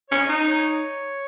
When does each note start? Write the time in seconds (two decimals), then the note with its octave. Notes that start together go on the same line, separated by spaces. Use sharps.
0.09 C#4 C#5
0.20 D#5
0.29 D#4
0.47 C#5